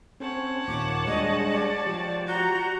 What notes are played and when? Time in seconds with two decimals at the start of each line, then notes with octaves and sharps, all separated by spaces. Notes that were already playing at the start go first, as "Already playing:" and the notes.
0.20 C4 C#4 C#5 F#5 A5
0.68 D#2 A#2 D6
1.07 G3 G#3 D4 D#5
1.51 D5
1.86 F3 G4
2.27 F#4 A#5 G6